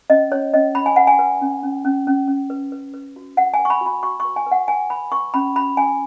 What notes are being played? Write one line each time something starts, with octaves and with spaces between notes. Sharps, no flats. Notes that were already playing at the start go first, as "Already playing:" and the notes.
C#4 D#5
C#4 C#5
C#4 D#5
C#4 B5
G#5
B4 F#5
G#5
B4
C#4
C#4
C#4
C#4
C#4
B4
B4
B4
F#4
B4 F#5
G#5
B4
C#6
B5
F#4
B5
F#4 C#6
C#6
B4
G#5
B4 F#5
B4 G#5
B4 B5
B4 C#6
C#4 B5
F#4 B5
C#4 G#5